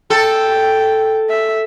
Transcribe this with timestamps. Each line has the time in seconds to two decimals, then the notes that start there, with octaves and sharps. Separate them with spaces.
0.10 A4 G5
1.29 E5